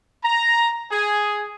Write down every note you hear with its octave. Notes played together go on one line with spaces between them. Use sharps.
A#5
G#4